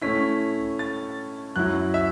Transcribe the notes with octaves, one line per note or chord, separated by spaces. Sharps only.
A2 A3 C#4 E4 B6
A6
F#2 F#3 C#4 E4 F#6
E5